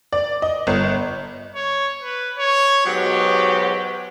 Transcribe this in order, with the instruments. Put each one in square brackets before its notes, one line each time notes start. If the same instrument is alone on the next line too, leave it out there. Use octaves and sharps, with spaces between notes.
[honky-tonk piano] D5
D#5
G1
[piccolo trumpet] C#5
B4
C#5
[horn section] G#2 B2 F#3 [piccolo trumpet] G4